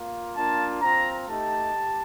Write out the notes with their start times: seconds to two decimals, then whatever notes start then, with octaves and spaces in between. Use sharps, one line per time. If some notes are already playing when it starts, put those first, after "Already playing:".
Already playing: A#3 F4
0.35 A#3 D4 F4 A5
0.81 C4 F4 A#5
1.27 A3 D#4 G4 A5
1.72 G4